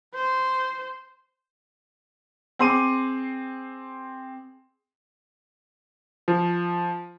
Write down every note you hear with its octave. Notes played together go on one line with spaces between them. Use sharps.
C5
C4 G#4 C6 D6 D#7
F3